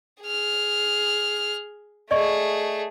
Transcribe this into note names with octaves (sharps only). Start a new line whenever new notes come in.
G#4 F6
A3 G#4 D5 D#5 C#6